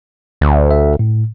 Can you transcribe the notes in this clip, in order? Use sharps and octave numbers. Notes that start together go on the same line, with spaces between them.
D2
E5
A2